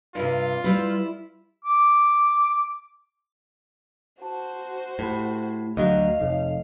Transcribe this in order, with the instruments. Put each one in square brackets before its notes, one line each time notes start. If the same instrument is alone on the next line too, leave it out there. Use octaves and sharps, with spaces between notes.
[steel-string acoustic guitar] G2 C3 [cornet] F4
[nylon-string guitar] G3 B4 [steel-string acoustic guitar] E4
[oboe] D6
[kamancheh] F#4 C5 [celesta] A5
[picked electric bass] A2 [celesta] G4 A4 B5
[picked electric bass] D2 F#3 [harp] D#5 [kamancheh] F5 [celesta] C#6
[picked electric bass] F1 [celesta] D#4 A4 C#5